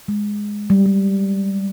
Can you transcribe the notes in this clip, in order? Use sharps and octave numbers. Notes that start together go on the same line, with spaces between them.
G#3
G3
G3